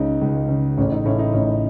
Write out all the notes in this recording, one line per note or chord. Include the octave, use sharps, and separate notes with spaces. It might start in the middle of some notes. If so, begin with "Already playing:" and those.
Already playing: C#2 C#3 C#4 D#4
C#2
C#3
A1 C#4
D#4
A2 C#4
D#4
A1 C#4